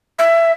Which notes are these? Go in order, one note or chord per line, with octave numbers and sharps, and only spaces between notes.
E5